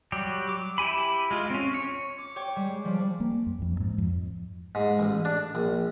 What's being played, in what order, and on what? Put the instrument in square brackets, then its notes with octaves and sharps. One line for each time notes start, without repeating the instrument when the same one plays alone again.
[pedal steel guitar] F#3 G3 G4
D6
E4 G4 G#5 B5
G#3 F4
C4 C#4
C#5
[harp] D6
C#5 G5 C#6 D6 G#6
G3 G#3
F3 G3 D4
[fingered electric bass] A#3
F#2
F2
G#2
F2
[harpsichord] G#2
A1
D4
A#1